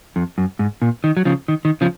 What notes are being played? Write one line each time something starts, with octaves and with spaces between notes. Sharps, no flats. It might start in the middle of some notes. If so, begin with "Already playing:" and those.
F2
F#2
G#2
A#2
D#3
F#3
C#3 F3
D#3
D#3
C#3 F3